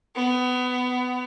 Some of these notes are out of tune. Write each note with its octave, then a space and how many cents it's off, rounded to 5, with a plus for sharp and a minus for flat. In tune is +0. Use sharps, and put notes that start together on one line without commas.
B3 +20